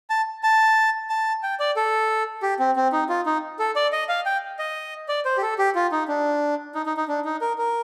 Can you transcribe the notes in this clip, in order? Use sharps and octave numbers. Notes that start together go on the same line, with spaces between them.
A5
A5
A5
G5
D5
A4
G4
C4
C4
D#4
F4
D#4
A4
D5
D#5
F5
G5
D#5
D5
C5
G4
A4
G4
F4
D#4
D4
D#4
D#4
D#4
D4
D#4
A#4
A#4